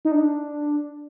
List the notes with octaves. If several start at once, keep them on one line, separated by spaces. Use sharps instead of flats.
D#4
D4